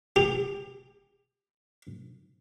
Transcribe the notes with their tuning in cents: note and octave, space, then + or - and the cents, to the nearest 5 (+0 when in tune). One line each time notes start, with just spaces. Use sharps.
G4 +25